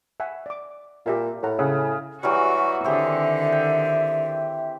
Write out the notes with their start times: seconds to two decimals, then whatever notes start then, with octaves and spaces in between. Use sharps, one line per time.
0.20 E5 F#5 G#5
0.46 D5 D6
1.06 A#2 G4 E5 F5
1.43 A2 A4 F#5 A#5
1.59 C#3 F#5
2.23 E3 F#3 G3 F#4 C#6
2.85 D3 D#3 C4 G4 G#4 E5
3.52 G5